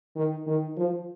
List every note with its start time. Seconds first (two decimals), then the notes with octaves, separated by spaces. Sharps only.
0.16 D#3
0.47 D#3
0.77 F3